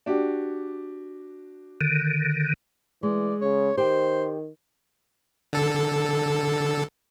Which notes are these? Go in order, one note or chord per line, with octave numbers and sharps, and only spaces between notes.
D4 F#4 G4
D3 D#3
E3 G#3 D5
C#3 C#5
D#3 G4 C5 G5
D3 A4